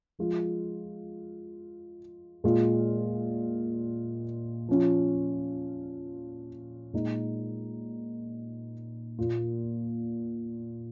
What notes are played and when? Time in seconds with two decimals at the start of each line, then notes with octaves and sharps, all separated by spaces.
0.19 F3 G#3 F4
2.44 A#2 G#3 F4
4.69 F3 C#4 F4
6.93 A#2 G#3 D#4
9.19 A#2 A#3 F4